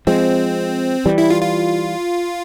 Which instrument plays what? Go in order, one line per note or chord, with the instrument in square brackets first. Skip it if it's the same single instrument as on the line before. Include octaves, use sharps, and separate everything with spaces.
[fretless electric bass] F3 G#3 [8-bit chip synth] C4
[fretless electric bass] E3 G3
[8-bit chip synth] E4
F4
F4